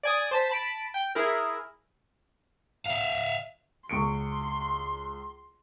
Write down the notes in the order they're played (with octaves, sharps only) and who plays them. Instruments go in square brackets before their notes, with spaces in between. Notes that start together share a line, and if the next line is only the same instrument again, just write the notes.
[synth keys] D5 G#5 D#6
C5 A5 B6
A5 B5 D7
G5
E4 G#4 A#4
[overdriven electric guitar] E5 F5
[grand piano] C#2 C#6 D7 [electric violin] C6